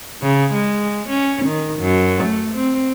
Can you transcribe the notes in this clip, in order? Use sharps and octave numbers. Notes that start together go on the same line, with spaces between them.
C#3
G#3
C#4
D#3
F#2
A3
C4